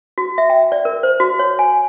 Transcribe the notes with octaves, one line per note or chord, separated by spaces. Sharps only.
F#4
E5
G5
D5
A#4
C5
F#4
C#5
G#5